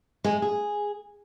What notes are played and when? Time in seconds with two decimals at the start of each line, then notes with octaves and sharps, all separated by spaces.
0.24 G#3
0.42 G#4